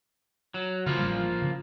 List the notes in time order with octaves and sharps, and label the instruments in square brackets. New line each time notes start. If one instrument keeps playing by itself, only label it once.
[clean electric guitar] F#3
[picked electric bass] C#3 [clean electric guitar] F3 A#3 F4
[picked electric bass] A1 G3
C#3